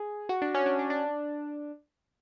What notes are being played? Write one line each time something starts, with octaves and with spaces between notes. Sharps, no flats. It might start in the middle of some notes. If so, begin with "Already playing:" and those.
Already playing: G#4
F#4
D4
C#4
D4
D4
D4